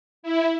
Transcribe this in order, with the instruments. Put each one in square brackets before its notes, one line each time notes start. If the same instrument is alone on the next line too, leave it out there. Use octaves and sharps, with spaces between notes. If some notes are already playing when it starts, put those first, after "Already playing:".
[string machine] E4